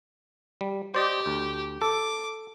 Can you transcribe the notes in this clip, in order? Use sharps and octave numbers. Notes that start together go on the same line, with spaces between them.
G3
G4 C5 D5 D#5
D2
A4 D6